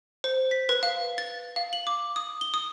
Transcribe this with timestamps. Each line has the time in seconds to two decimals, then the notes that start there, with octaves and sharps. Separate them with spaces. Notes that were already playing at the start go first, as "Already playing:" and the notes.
0.24 C5
0.51 B6
0.69 B4
0.83 F5
1.18 A6
1.56 F5
1.73 F#7
1.87 D6
2.16 D#6
2.41 G7
2.54 D#6